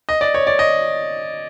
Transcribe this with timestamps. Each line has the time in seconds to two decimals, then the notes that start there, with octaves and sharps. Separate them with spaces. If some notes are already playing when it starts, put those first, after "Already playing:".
0.09 D#5
0.21 D5
0.34 C#5
0.47 D5
0.59 D#5